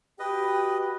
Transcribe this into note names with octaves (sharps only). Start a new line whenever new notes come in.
F#4 G4 B4 D#5 G5